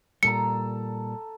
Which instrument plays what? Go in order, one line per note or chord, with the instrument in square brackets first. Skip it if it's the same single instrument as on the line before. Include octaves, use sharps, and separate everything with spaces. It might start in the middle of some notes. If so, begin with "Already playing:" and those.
[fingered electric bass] A#2 G3 [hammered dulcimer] A4 A#5 [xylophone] C#7